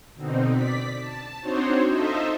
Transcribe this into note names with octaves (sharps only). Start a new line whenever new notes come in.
B2 D3 C4 D#4
D5 B6
A5
C4 D4 D#4 F#4 C5 C#5
D#4 F4 A4 C5 D#5 E5